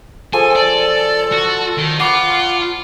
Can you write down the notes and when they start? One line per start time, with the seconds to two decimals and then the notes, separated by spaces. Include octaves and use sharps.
0.33 F3 G#4 A4 G#5 D#6
0.56 D5
1.32 F#4 A5
1.78 D#3
2.00 F4 D5 F#5 B5 C#6